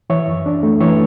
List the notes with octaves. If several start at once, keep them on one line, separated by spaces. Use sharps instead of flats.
E3 C#5 E5
F#2
D4
A3
E3 C#5 E5